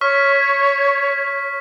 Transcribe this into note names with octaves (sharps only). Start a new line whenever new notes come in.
C#5 C#6 F6 B6